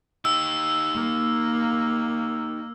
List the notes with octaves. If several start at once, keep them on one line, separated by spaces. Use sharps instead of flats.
D#4 G4 E6
A#3